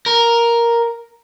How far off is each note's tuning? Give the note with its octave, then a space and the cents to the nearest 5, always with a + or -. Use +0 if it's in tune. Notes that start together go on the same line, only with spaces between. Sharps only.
A#4 +5